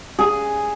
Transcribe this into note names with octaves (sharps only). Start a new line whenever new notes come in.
G#4